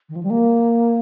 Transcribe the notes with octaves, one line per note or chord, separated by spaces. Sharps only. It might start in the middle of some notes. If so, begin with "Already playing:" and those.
D#3
F3
G3
A#3